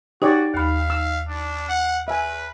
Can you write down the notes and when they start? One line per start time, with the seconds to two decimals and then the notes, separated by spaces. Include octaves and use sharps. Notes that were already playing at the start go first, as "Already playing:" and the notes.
0.22 D#4 F#4 G4 C#5 D5
0.54 D#2 F5 B5
0.90 E6
1.28 D4
1.69 F#5
2.08 B4 E5 G#5